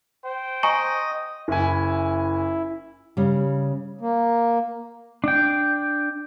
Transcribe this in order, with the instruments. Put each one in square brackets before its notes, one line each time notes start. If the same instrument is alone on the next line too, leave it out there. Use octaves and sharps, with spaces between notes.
[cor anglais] C5 [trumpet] G5
[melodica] D#5 [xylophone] G#5 A#5 C#6
[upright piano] F#1 G#5 [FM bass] E4
[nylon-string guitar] C#3 G3
[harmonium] A#3
[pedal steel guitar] D4 G5